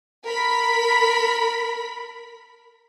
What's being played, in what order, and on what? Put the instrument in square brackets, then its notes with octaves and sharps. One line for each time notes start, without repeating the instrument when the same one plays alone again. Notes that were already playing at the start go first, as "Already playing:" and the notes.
[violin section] A#4 B5 B6